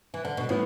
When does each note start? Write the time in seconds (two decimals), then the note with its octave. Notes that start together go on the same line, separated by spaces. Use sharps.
0.14 E3
0.25 D3
0.37 B2
0.49 A2 E3 B3